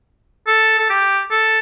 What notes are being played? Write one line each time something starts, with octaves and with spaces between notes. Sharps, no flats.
A4
A4
G4
A4